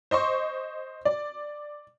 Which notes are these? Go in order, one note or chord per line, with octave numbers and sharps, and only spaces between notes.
C5 D#5 C6 C#6
D5